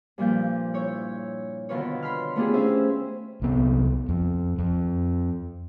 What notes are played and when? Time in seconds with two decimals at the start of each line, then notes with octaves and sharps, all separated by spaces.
0.18 G2 A#2 F3 G6
0.74 E4 C#5 G6
1.69 B2 D3 D#3 F4 B4 C#5
2.02 B5 C6 F6
2.36 A3 B3 D4 F4 G4 G#4
2.54 C#4 C5 E5
3.42 C2 B3
4.09 F2
4.58 F2